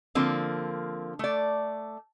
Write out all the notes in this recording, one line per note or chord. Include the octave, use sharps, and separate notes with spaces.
D3 F3 A#3 C4
A3 D5